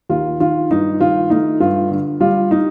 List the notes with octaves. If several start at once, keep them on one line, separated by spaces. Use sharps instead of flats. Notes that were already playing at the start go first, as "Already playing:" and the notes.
D#2 F4
D#3 F4
G2 D#4
D#3 F4
A3 D#4
G2 F4
D3
G3 F4
D#4